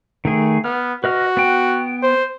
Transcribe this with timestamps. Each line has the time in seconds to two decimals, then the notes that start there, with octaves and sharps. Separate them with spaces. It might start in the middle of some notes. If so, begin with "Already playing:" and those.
0.25 D#3 A3 G#4
0.64 B3 F6
1.04 F#4 B4 D#5 F6
1.37 B3 G5
2.03 C5